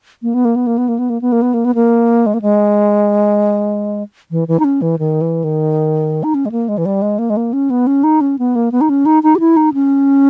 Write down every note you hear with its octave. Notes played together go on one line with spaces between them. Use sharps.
A#3
B3
A#3
B3
A#3
B3
A#3
B3
A#3
B3
A#3
B3
A#3
B3
A#3
G#3
A#3
G#3
E3
E3
D#4
C#4
E3
D#3
E3
D#3
D#4
C#4
G#3
A#3
G#3
E3
G3
G#3
A#3
G#3
A#3
C#4
B3
C#4
D#4
C#4
B3
A#3
B3
D#4
C#4
D#4
D#4
G4
E4
D#4
C#4